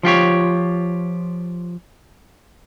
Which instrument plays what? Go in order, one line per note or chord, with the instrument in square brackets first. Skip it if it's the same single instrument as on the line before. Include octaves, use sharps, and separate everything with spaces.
[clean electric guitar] F3 F4 G4 C#5